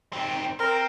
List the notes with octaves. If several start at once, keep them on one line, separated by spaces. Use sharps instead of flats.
D#3 C4
C4 A#4